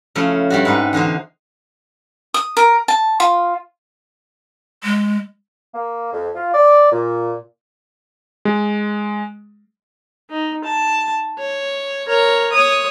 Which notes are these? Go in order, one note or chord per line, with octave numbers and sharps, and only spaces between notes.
C#3 F3 A3 E4
G2 G3 F#4
G#2 D#4 B4
E2 D3 D#4 C5
D#6
A#4
A5
F4
G#3
A#3
F2
F4
D5
A#2
G#3
D#4
A5
C#5
A#4 C#5
C#5 D#6